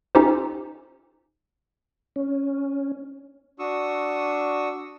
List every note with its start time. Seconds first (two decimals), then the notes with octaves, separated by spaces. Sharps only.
0.15 C#4 D#4 F4 G4 A4 C5
2.16 C#4
3.59 D4 F#4 C#6 D#6 E6